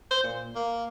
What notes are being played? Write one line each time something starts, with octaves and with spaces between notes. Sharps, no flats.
C5
A#2
A#3